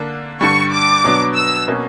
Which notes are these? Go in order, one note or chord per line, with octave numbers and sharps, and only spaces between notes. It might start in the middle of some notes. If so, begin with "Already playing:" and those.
Already playing: D3 A#3 D4
G2 D3 G3 C#6
D6
B2 F#3 B3 D4
E6
B2 A#3 C#4